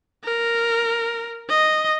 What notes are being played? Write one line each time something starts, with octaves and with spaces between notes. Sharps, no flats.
A#4
D#5